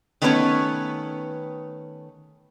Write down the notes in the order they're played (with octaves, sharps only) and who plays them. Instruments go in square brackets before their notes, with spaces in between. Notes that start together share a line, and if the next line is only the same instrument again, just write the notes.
[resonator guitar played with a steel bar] D#3 A3 B3 C#4 B4 C#5